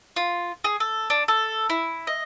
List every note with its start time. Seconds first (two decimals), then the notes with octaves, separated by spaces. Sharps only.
0.16 F4
0.64 G#4
0.80 A4
1.10 D4
1.28 A4
1.70 E4
2.07 D#5